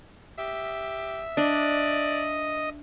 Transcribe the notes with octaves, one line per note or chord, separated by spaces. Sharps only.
G4 E5
D4 D5 D#5